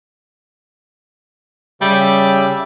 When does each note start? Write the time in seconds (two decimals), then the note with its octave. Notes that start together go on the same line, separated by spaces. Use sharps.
1.81 C#3 G3 E5 D6